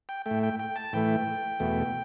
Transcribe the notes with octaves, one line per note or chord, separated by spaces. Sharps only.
G5
A3 G5
A2
G5
G5
A5
A2 E3 A3 G5
E2 B2 A3